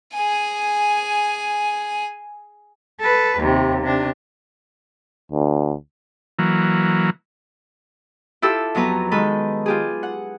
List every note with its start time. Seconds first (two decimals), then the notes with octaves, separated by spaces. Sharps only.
0.14 G#4 G#5
3.00 A4 B4
3.38 D#2 C3
3.83 C3 D4
5.32 D2
6.39 E3 F#3 A#3
8.42 E4 F4 G4 A4 E6
8.75 F2 F#3 B3 B4 A#5
9.11 D#3 G#3 A4 B4
9.66 F4 G4 G#4
10.03 F#5